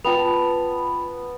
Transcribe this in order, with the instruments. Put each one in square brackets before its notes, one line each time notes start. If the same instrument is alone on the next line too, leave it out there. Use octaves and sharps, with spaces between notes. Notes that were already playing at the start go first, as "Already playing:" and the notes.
[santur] B3 A5 [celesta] F4 G5 F7